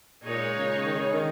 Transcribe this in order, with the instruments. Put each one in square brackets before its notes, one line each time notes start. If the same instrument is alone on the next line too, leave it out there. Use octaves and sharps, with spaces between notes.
[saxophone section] A#2 [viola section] G#3 D#4 G#4 C#5
[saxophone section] C#3
D#3
C#3
D#3